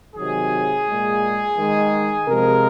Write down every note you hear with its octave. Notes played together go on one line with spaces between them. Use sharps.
C3 D#3 F#3 G#4
A#2 G#3
D#3 G#3
C3 F3 G#3 A#4